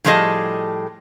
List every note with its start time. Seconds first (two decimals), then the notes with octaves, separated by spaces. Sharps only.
0.04 A2 F3 G3 G#4 A4 D#5